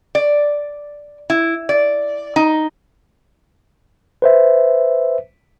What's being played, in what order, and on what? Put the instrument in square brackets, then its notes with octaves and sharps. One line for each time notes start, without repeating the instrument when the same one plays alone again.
[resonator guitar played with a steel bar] D5
E4
D5
D#4
[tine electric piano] B4 C5 E5